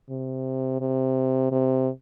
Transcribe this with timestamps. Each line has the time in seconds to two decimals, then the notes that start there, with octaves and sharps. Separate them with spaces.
0.10 C3
0.81 C3
1.52 C3